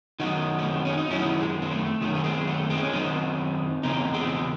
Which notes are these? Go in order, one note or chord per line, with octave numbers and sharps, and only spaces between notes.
F#2 D#3 D#4 F#4
A3
C4
C#4
D#4
F#2 D#3 C#4 E4
G#3
C4
A3
F#2 D#3 A3
C#4
G#3 C4
A3
G#3 C4
C#4
F#2 D#3 C4 D#4
E2 C#3 C4 D#4
G#3 C4